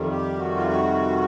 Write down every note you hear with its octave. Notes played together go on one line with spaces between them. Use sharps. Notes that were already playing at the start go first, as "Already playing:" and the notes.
Already playing: F2 C3 D#3 G3
G4
F#4
F4
F#4